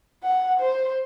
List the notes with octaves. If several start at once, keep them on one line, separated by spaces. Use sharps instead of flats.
F#5
C5